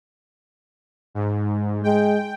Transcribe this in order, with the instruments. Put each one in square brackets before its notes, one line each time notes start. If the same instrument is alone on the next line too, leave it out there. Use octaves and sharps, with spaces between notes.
[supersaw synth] G#2
[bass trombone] G#3 [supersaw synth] G5